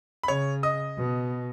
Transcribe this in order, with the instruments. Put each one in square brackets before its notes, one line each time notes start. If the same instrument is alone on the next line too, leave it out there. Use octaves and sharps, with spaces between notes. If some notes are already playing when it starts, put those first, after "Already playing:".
[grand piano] B5
[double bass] C#3 [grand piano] C#5 C#6
[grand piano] D#5 D#6
[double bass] B2